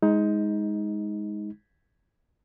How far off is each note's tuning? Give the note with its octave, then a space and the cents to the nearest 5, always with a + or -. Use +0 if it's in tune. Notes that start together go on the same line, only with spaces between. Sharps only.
G#3 -5 D#4 +20